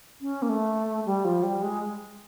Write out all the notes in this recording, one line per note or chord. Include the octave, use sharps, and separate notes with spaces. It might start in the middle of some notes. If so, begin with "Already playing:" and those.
C#4
A#3
A3
G3
F3
G3
G#3